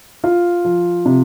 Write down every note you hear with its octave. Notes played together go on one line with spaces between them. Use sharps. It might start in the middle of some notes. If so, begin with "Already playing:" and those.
F4
F3
C3